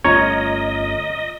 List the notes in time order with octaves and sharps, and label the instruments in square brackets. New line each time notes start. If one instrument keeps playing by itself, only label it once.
[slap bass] G1 A3 C#4 [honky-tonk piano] F4 A#5 [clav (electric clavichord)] C#5 [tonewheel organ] D#5